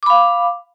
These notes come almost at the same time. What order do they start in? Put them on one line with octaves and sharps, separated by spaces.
D6 B5 F5